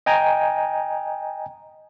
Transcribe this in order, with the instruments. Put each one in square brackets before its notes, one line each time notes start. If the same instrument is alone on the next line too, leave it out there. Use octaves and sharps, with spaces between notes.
[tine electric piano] D#5 G5 G#5 A#5